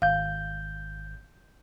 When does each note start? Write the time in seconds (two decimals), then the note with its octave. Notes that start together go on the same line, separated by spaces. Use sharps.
0.02 G#1 F5 G6